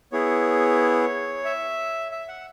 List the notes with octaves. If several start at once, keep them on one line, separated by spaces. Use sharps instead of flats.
B3 E4 G#4 C#5
E5
E5
F#5